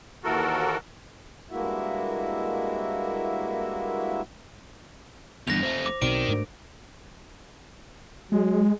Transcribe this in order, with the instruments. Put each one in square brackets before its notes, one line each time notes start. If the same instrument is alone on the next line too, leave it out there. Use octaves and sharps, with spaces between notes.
[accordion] D#2 E3 F#4 A4 A#4
[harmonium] G2 G#3 A#3 E4 F#4 E5
[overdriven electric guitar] E2 G2 [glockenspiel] A#6 F7
[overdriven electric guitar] F2 A3 [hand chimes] C5
[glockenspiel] D6
[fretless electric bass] B1 B2 C4 [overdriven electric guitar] D#3 [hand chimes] F#4 C5 D5 [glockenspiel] D7
[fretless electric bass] G#2 A3 [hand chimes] D4 A#4
[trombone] F#3 [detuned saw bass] G#3